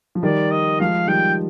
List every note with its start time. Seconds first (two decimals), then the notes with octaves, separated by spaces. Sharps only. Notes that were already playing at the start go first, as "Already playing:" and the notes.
0.15 F3
0.23 D#3 G3 D5
0.51 D#5
0.80 F3 G#3 F5
1.07 D#3 G3 G5